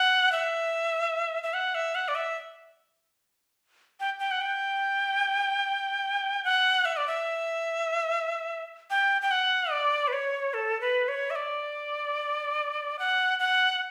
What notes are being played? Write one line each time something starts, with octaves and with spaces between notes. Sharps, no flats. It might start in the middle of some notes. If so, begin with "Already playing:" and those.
Already playing: F#5
E5
E5
F#5
E5
F#5
D5
E5
G5
G5
F#5
G5
F#5
E5
D5
E5
G5
G5
F#5
D5
B4
C#5
A4
B4
C#5
E5
D5
F#5
F#5